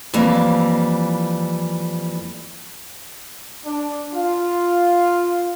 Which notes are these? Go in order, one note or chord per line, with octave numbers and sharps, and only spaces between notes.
F2 E3 G3 A#3
D4
F4